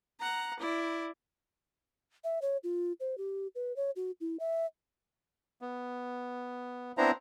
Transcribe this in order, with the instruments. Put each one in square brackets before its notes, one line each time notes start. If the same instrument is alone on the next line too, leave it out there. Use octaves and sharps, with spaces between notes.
[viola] F#5 A#5
E4 D5
[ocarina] E5
C#5
F4
C5
G4
B4
C#5
F#4
E4
E5
[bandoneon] B3
B3 C4 D4 E4 C5 A#5